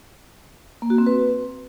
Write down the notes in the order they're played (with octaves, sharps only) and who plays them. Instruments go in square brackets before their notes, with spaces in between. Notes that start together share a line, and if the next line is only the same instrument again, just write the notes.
[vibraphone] A#3
F#4
C4
B4